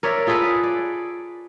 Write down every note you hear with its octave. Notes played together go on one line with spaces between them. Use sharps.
A#4 C#5 D5 E5
F4 G#4 A4 B4
D5